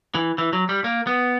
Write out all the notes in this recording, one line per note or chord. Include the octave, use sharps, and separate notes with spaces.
E3
E3
F#3
G3
A#3
B3